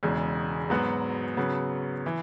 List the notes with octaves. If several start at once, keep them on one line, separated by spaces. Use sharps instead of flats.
E1 E2 C#3 G#3
G#2 F#3 B3 F#4
C#3 F#3 B3
E3